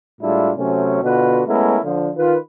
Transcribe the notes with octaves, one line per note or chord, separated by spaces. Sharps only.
A2 G3 G#3 D4 E4 F4
C3 F#3 A3 C4 C#4
B2 D3 B3 F4 F#4 B4
G#3 A3 B3 C#4 E4 A#4
D3 F3
D#3 F4 B4